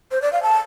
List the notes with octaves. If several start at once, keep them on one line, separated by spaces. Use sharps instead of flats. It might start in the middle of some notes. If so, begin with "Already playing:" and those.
C5
D5
F5
A5